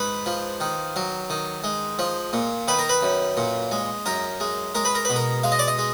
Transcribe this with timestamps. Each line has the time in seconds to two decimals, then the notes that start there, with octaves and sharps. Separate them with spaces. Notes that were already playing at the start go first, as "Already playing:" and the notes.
Already playing: G#2 B4
0.26 F3
0.60 D#3
0.96 F#3
1.30 D#3
1.64 G#3
1.99 F3
2.33 A#2
2.68 D#3 B4
2.79 A#4
2.89 B4
3.02 F#2
3.37 A#2
3.71 G#3
4.06 F#2 A#4
4.40 G#3
4.75 G#3 A#4
4.85 B4
4.95 A#4
5.05 B2 B4
5.16 A#4
5.44 G#3 F5
5.52 D#5
5.59 D5
5.68 D#5
5.79 G#3